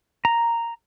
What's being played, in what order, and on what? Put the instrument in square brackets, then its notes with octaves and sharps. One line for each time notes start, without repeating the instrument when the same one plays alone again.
[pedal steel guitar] A#5